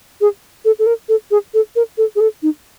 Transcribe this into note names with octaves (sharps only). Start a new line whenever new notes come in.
G#4
A4
A4
A#4
A4
G#4
A4
A#4
A4
G#4
A4
D#4